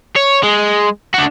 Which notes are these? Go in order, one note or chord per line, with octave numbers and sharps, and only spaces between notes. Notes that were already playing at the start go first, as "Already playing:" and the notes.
C#5
G#3
D4 F#4